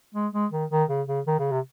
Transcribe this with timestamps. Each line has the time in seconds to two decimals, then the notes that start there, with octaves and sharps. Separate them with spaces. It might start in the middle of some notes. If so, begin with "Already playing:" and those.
0.15 G#3
0.33 G#3
0.52 D#3
0.71 D#3
0.89 C#3
1.08 C#3
1.27 D#3
1.39 C#3
1.51 C3